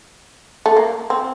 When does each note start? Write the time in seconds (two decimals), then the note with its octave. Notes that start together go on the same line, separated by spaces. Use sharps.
0.66 A3
0.77 A#3
1.10 C4